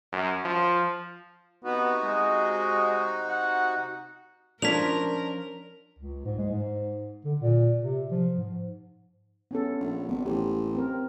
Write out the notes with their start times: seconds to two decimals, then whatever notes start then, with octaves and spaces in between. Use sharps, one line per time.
0.13 F#2
0.45 F3
1.65 C3 B3 D#4 F#4
2.04 G#3
3.29 F#5
4.62 F3 C#4 D4 A#4 B6 F7
5.99 C#2
6.26 G#2
6.38 G#3
6.52 G#2
7.25 D3
7.40 A#2
7.82 C3
8.11 F3
8.37 G#2
9.51 B3 C#4 A4
9.81 A#1
10.09 G#1 B3
10.25 A1 G4
10.75 C4 A#4